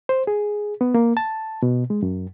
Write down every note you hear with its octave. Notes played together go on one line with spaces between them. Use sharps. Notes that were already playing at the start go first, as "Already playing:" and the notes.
C5
G#4
B3
A#3
A5
B2
G#3
F#2